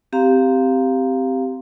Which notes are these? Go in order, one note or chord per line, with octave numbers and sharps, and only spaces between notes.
C4 G4 F5 A#5